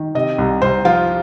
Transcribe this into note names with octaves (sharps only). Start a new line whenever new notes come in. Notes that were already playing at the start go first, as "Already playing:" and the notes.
Already playing: D#3
C3 D#5
C2
C2 C5
F3 F4